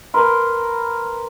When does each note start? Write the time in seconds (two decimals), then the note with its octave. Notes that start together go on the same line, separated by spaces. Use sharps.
0.14 A#4 B4 C6